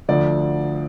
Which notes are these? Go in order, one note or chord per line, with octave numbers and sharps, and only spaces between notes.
D2 D3 F3 D5